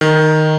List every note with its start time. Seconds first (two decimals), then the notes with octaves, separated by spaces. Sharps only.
0.01 D#3